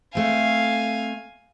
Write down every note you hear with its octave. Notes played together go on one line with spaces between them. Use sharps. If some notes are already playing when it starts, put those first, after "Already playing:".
A3 C4 F5 G#5